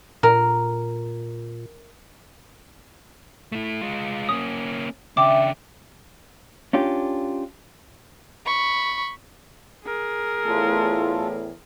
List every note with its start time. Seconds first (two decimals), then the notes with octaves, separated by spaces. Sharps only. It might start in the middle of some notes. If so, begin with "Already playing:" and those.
0.23 A#2 A#4
3.52 A3 E4
3.81 G#3 F4
4.29 A#3 C#4 D#6
5.17 C#3 D4 E5 G5 D6
6.73 C#4 D4 F4 G4
8.46 B5 C#6
9.85 G#4 A#4
10.45 E2 A2 F4 A4